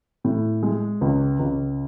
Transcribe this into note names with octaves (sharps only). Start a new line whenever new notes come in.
A2
G#3
C#2
C#2